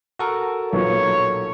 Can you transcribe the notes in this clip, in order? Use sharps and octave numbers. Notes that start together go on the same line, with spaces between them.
F#4 A4 A#4
B1 A#2 C#5